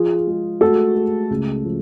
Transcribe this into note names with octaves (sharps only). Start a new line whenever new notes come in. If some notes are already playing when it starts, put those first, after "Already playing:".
Already playing: F3 F4 G#4
G#3
A3 F#4 A4
A3
C#2
F3